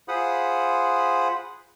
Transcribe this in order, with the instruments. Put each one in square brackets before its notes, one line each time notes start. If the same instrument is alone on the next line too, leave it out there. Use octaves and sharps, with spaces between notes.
[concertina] F4 G#4 C5 F#5 B5 D#6